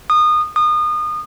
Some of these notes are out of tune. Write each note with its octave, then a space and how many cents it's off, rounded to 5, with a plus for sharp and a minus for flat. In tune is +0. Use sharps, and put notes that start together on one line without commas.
D#6 -25
D#6 -30